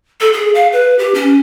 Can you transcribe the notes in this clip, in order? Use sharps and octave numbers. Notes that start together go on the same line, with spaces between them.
A4
G#4
F5
B4
G4
C#4